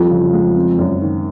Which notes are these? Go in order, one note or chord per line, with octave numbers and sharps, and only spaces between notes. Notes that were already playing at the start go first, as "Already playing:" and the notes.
Already playing: F2 E3 G3
C#3
G#3
C4
F#2
D#3